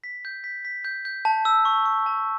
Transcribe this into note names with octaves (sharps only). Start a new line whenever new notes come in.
B6
G6
B6
B6
G6
G6
A5
E6
C#6
C#6
A5